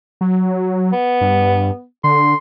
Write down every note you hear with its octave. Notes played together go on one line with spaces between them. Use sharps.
F#3
B3
G2
D3 C6